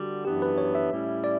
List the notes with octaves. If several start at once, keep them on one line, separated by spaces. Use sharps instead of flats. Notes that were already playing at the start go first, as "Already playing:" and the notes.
Already playing: D3 G3 F#4
F#2 E3 B3 D4 G4
B4
C#5
E5
A2 G3 C#4 E4
D5